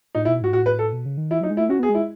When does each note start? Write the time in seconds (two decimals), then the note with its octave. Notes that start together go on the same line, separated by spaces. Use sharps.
0.15 A2 D#4
0.25 E4
0.28 B2
0.41 G#2 F#4
0.53 A2 F#4
0.66 B4
0.79 A4
0.93 B2
1.06 C#3
1.17 D#3
1.31 E3 E4
1.41 F#3 D#4
1.50 G#3
1.57 A3 E4
1.69 C#4 F#4
1.79 B3 G#4
1.89 G#3
1.95 E4